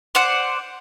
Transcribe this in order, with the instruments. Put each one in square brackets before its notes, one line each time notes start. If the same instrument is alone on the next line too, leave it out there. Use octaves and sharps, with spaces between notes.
[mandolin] C5 D5 F#5